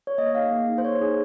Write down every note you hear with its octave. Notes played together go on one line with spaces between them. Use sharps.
C#5
A#3 D#5
D#4 G#4 F5
A#3
D#4 G#4
C5
A#3 C#5
D#4 G#4